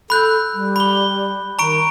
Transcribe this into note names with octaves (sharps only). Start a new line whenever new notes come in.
A4 B5 F#6 G6
G3
B5 G7
D#3 A#5 C#6 D7